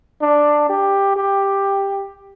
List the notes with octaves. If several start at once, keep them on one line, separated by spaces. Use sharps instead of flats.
D4
G4
G4